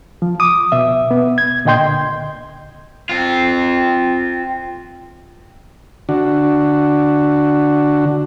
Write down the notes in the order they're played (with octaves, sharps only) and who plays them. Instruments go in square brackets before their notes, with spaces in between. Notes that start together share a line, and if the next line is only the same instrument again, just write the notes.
[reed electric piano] F3
D6 D#6
B2 E5
B3
G#6
A#2 D3 D#5 G5 C6 G6
[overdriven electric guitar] C4 F4
[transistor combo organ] D3 D4 F#4